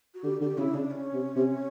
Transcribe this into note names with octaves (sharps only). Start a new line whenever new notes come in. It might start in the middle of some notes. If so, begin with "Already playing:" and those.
F#4
D3 G4
D3 G4
C#3 E4
C#3 D4
C#4
C3
C3